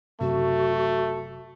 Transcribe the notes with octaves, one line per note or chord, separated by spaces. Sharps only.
F#1 F#2 C3 A3 F#4